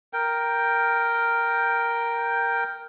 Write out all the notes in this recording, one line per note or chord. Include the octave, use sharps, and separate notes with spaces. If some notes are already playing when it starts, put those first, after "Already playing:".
A#4 G5